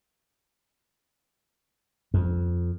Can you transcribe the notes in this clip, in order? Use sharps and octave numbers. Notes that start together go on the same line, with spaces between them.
F2